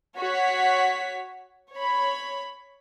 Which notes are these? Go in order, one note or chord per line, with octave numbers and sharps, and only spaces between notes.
F#4 C#5 B6
C#5 B5